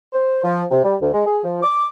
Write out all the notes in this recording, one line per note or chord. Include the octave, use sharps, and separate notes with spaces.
C5
F3
C3
G3
D2
G#3
G#4
F3
D6